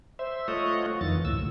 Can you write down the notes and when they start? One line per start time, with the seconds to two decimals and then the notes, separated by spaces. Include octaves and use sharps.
0.19 C5 E5
0.48 A3 F4 C#5 D#5 F#5
1.01 F2 D#3 E3 A6
1.25 D2 A2 E6